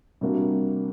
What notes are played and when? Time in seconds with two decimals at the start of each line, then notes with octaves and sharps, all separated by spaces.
0.21 C3 G3 A#3 D4 F#4